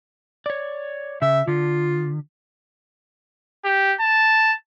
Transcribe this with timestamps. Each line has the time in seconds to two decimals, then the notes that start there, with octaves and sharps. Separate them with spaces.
0.46 C#5 D5
1.22 C#3 E5
1.47 D3 F4
3.65 G4
4.01 A5